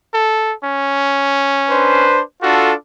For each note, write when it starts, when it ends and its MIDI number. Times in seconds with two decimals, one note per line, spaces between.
0.13 0.54 69
0.63 2.08 61
1.70 2.20 62
1.70 2.20 71
1.70 2.20 72
2.42 2.73 62
2.42 2.73 65
2.42 2.72 66
2.42 2.73 69